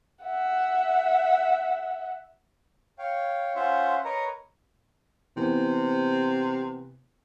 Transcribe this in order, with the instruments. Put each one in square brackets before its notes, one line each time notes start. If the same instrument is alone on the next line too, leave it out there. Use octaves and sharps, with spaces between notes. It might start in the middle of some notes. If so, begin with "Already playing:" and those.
[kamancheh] E5 F#5
[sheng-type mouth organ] C#5 F5 G5
C#4 F4 C5 E5 F#5
A#4 B4 C#5 D#5 A#5
[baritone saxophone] C3 [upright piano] E3 B3